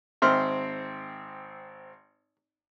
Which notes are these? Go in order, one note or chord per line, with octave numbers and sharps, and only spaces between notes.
G#1 C4 E5 C6 F6